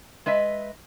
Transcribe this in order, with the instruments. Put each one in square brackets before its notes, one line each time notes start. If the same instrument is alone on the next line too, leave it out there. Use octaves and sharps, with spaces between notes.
[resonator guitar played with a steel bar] G#3 B4 D#5 E5